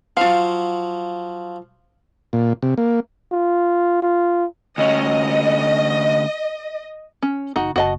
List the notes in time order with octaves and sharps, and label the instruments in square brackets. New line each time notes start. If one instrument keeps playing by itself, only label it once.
[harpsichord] F3 F#3 [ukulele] F4 F5
[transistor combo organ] A#2
C3
A#3
[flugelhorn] F4
F4
[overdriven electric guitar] D2 C#4 [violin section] D#5
[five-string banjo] C#4
[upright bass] F#1 E3 [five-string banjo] D#4 F#4
[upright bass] F#1 [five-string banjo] F#4 D#5 A5